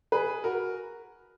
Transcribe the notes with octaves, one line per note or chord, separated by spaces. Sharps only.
G#4 B4
F#4 A#4